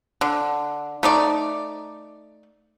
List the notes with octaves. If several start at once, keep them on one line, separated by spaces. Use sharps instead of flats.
D3
A3 D#4 D5